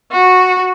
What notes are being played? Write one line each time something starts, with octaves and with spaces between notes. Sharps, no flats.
F#4